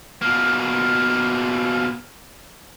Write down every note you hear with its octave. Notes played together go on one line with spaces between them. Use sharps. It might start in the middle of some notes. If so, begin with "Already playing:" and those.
B2 A#3